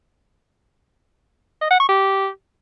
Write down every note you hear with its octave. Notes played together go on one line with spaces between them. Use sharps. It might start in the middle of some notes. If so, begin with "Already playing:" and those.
D#5
F#5
C#6
G4